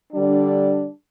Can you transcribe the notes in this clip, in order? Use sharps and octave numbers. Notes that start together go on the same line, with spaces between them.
D3 G3 D4